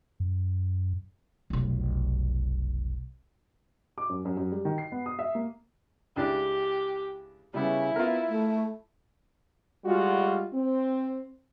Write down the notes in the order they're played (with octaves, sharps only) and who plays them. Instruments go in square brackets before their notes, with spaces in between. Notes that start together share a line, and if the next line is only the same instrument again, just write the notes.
[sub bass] F#2
[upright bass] F1 B1
[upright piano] D6
F#2
F#2
F#2
G3
D#3
C7
B3
D#6
E5
A#3
[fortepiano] C#2 D4 E4 [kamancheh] G4
[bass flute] C#3 [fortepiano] G3 B3 [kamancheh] E4
[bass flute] B3 [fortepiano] F4 A#4
[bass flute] A3
[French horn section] G3 G#3 F4 F#4
C4